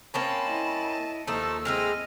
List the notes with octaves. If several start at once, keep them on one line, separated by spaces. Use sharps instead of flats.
A#3 C4 C#4 A5 B5
E4 D#5
D#2 F3 A3 D#4 A4 A5 E6
G#3 C4 E4 D#5 F6